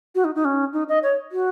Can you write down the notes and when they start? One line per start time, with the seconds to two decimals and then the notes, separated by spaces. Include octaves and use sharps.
0.15 F#4
0.24 D#4
0.35 D#4
0.45 C#4
0.73 D#4
0.89 D#5
1.03 C#5
1.32 F#4